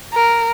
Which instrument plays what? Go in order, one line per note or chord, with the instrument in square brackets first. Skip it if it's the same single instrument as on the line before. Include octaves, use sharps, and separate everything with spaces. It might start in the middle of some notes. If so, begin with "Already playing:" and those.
[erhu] A#4